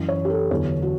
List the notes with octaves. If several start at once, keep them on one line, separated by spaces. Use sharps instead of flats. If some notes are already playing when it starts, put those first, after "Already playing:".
Already playing: F#2 E3
C#5
G4
A4
E2 D3 F#3 C#5
F#4